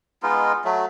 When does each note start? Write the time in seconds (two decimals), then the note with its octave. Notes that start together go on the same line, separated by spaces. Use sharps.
0.23 G#3 B3 D#4 F4
0.65 F#3 A3